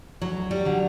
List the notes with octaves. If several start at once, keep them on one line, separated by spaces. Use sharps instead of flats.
D2 F#3
G3
D3 F#3